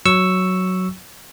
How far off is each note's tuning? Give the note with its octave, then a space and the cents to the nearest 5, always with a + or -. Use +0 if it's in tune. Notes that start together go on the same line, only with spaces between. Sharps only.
F#3 +0 C#6 +0 E6 +0